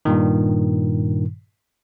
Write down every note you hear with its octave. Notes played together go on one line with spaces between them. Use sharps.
G2 A#2 D#3